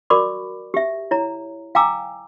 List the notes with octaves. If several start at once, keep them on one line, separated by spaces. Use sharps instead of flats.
F#4 A#4 D5 B5 C#6 D6
G4 E5
E4 C#5 A#5
F5 G5 G#5 A#5 D6 E6